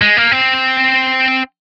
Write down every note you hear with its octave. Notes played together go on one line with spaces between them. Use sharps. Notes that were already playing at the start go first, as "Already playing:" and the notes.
G#3
A#3
C4